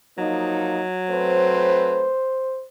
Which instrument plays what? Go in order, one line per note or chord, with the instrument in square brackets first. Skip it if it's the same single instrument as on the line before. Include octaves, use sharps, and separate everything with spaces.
[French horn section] F3 A#3 D#4 [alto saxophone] F#3
[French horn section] A3 C4 B4 [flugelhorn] C5